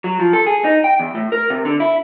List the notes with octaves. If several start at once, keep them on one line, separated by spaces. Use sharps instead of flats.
F#3
F3
A4
G#4
D#4
G5
E2
A2
A#4
C3
D3
E4